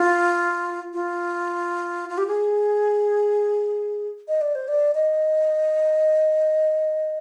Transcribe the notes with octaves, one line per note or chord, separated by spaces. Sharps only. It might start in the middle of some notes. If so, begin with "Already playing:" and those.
Already playing: F4
F4
F4
G4
G#4
D#5
D5
C5
D5
D#5